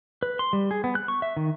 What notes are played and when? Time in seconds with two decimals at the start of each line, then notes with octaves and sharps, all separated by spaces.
0.23 B4
0.39 C6
0.53 G3
0.71 G#4
0.84 B3
0.95 F#6
1.08 C#6
1.22 E5
1.37 D#3